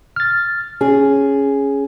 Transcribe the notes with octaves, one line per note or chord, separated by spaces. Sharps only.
F6 A6
C#4 G#4